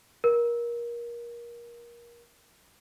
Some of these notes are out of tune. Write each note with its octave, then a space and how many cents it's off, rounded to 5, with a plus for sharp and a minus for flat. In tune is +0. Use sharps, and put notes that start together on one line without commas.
A#4 +25